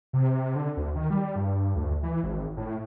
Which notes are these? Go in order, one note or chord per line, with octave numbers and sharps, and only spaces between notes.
C3
D3
D2
D#3
G3
G2
D2
E3
G#1
A2